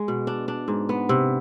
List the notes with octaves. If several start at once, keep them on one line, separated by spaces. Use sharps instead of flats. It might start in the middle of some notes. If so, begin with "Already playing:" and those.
Already playing: G#3
B2
D4
D4
G#2
B3
C3